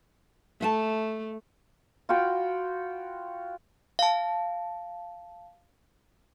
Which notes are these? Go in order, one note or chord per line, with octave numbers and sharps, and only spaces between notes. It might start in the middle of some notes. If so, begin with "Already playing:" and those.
A3 E5 F5 A5
F4 F#4 G5 B5
F5 A5